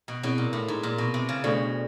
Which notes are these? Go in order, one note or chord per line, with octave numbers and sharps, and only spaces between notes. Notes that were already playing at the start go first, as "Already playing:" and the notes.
B2
B2 C4 E4 G#4 C#5
A#2
A2
G#2
A#2
B2
C3
C#3
B2 A3 D4 F#4 A4 D5